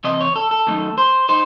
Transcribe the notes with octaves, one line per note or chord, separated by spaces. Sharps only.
C3 E3 C4 D#5
C#5
A4
A4
F#2 D#3 A3 D#4
C5
D#4 C5